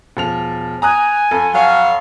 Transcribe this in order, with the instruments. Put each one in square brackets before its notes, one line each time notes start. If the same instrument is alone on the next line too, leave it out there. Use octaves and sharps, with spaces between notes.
[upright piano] E1 F3 F7
[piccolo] G#5 [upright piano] A#5 D#6 F#6
[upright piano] F2 A4
[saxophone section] F#3 C#5 F5